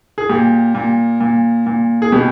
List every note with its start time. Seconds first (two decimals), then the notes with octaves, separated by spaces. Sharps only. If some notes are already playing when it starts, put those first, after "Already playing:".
0.18 G#4
0.29 A#2 G4
0.75 A#2
1.21 A#2
1.67 A#2
2.02 G#4
2.12 B2 G4